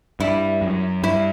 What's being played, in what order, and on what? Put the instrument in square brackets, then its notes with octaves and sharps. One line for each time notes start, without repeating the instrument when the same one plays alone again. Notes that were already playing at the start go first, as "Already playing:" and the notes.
[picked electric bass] G2 [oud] E4
[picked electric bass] F#2
[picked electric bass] G2 [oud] E4